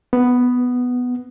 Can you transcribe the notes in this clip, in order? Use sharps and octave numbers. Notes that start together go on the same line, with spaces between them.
B3